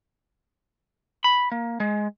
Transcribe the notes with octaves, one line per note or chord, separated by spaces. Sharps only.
B5
A#3
G#3